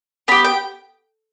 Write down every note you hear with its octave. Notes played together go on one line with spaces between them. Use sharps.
B3 G4 B5
G5